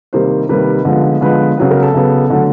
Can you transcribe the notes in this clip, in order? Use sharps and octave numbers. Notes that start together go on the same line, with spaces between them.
C3 D#3 G3 A#3 C5
C3 D#3 G3 A#3 B4
D3 F3 G#3 B3
D3 F3 G#3 B3 B4
C#3 F#3 B3 B4
A#4
A4
C#3 F#3 B3
D3 F#3 A3